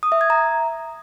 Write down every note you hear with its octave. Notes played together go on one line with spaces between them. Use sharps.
D#6
E5
G#6
A#5